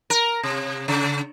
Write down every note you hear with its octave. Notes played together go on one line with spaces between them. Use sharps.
A#4
C3
C#3